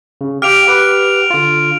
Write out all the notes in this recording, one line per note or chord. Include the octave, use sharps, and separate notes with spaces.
C#3
G4 F5 G5 F6 D7 F7
G4 B4 F#5
D3 F4